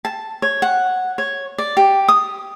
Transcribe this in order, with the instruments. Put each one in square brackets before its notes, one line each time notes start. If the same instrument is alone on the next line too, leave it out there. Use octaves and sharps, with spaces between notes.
[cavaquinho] A5
C#5
F#5
C#5
D5
G4
D#6